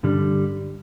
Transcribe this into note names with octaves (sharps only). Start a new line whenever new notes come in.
G2 D3 G3